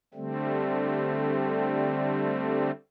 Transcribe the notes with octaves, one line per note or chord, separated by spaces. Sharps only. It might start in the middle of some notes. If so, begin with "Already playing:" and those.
D3 G3 A3 C4